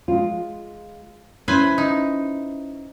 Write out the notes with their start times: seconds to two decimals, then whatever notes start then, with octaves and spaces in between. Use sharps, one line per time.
0.08 G#3 F4
1.48 C#4 E4 B4 C5 G#5
1.78 D#4